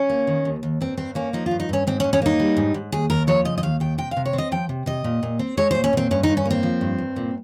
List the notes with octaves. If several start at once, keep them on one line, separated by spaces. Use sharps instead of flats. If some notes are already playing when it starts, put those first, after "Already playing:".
Already playing: C#4
A#3
D#3
D#2
D#2
G2 C4
G2 C4
A#3 C#4
F3 D#4
F4
G2
D#4
G2 C#4
G#2 C4
C#4
G#2
C#4
A#3 D#4
G3
G#2
G#2
D#2 G#4
D#2 A#4
F3 C#5
C#3 D#5
D#5
D#2 F5
D#2 G5
C3 G5
F5
C3
C#5
C4
D#5
F3 G5
C3
C3 D#5
A#2
A#2
C4
G#3 C#5
C5
A#2
C#4
A#2 C4
G2 C#4
D#4
G2
C#4
A#3
C4
F3
G2
G2
A#2